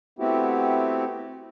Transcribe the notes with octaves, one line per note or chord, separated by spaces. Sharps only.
A3 B3 C4 E4 F#4 G4